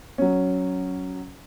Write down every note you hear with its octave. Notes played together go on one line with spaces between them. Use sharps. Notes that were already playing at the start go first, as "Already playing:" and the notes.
F#3 C#4